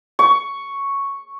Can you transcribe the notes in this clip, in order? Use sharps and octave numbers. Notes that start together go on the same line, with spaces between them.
C#6